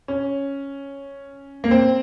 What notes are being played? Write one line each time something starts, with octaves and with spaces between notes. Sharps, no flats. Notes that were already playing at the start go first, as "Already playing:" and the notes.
C#4
A#3
C4